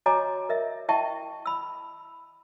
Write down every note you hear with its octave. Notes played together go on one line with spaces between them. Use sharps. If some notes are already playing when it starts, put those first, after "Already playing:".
F#4 C#5 D#5 G#5 A#5 D6
A#4 D#5 E5
E4 D#5 E5 G5 A5 C#6
B5 E6